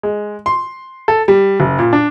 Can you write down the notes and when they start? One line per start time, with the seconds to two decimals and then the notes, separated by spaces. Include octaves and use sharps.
0.03 G#3
0.46 C6
1.08 A4
1.28 G3
1.60 F#1
1.79 A#2
1.93 D4